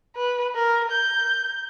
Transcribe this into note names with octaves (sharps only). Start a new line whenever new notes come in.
B4
A#4
G6